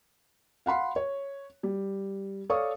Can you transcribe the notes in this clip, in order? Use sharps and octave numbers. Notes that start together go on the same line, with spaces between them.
F5 F#5 B5 C6
C#5
G3
A4 C#5 D5 F5 C#6 D#6